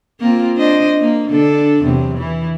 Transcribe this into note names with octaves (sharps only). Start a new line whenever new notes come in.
A#3 C4 F4
D4 C5 D#5
A#3
D3 D4 A4
E2 C3 F#3
E3 E4